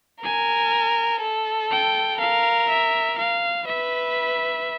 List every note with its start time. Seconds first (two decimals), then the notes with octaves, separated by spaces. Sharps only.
0.24 A#4 G#5
1.22 A4
1.71 G5
2.20 A#4 F5
2.69 E5
3.18 F5
3.67 B4 E5